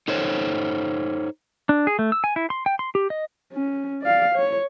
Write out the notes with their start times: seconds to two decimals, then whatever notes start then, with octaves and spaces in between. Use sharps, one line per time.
0.08 D#4 A4 C5 C#5
1.69 D4
1.87 G#4
1.99 A3
2.12 E6
2.24 G#5
2.36 E4
2.50 C6
2.66 G5
2.79 C6
2.95 G4
3.10 D#5
3.53 C#4
4.02 D5 F5
4.35 C#5